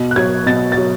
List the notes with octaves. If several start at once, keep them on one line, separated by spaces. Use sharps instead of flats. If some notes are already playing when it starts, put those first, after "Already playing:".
Already playing: B2
F#6
F#3 G#6
B2 A6
F#3 A6